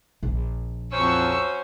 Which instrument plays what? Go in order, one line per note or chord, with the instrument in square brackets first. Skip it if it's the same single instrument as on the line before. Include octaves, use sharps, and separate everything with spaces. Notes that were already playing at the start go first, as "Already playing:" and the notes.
[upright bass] A#1
[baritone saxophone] F2 [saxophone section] F#3 C#4 C5 [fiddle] C#6 E6